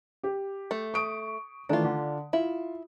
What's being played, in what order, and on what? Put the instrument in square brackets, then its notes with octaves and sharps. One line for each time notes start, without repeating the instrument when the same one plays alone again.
[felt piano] G4
[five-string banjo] A3
[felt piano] C#6 D#6 D7
[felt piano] D#3 E3 A3 [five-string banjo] D4 F4
[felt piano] D3
[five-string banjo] E4 [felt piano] F4